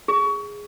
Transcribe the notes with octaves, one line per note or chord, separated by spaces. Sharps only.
G#4